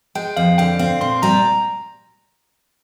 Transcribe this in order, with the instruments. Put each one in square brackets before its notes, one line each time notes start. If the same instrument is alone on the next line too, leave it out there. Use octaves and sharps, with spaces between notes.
[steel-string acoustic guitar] G#3 [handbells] G5
[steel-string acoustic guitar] F2 [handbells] F5
[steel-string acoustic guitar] D3 [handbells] G5
[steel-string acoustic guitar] C4 [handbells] F5
[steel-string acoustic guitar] A#2 [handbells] C6
[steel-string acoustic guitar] G3 [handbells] A#5